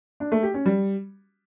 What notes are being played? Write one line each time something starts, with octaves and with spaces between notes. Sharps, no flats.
D4
A3
G4
C#4
G3